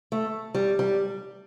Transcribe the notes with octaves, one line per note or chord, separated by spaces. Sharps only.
A3
G3
G3